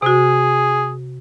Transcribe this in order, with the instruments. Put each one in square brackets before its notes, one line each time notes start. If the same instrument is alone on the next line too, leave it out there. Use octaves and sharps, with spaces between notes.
[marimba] C3 F#4 [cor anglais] G#4